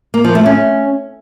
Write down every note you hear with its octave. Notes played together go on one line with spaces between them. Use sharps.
A#3
F3
A3
C#4